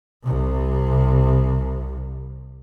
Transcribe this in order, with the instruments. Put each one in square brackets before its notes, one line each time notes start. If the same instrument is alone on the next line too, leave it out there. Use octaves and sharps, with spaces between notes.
[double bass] C2 C3